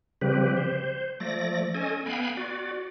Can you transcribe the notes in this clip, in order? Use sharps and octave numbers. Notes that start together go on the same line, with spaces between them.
C#3 F3 G3 C4 G4 B4
C5
F3 A3 D5 A#6
C#4 A4 D#5 G#5
B3 F5 G5 G#5 B5
F#4 D5